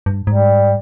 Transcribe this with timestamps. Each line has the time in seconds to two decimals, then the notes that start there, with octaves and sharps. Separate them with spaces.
0.06 G2
0.27 G#2 G3